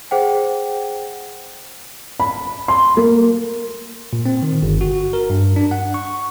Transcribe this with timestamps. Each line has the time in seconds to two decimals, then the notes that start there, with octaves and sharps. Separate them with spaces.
0.11 G#4 C5 F#5 G5
2.20 B5
2.68 C6
2.97 A#3
4.13 A#2
4.26 C4
4.43 D#3
4.62 G1
4.81 F#4
5.13 A#4
5.30 G2
5.56 D4
5.71 F#5
5.94 C#6